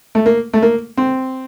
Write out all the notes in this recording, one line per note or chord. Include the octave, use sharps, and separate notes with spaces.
A3
A#3
A3
A#3
C4